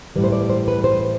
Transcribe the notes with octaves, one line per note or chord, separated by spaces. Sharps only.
A2 E3 G3 B4
C5
D5
C5
B4
C5